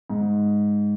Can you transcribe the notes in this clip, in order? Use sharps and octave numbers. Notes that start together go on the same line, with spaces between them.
G#2